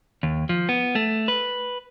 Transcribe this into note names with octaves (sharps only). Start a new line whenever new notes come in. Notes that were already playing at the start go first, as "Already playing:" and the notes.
D#2
F3
B3
A3
B4